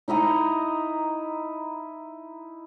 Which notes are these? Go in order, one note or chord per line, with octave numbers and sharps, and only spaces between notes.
D#4 E4 D#5 A#5